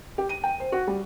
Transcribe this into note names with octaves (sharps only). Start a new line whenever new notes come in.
G4
D#7
G5
C5
F#4
G3